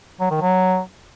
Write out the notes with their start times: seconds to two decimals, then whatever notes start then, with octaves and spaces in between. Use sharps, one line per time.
0.20 F#3
0.31 D#3
0.41 F#3